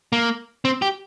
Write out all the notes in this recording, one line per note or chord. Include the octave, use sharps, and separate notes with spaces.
A#3
C4
G4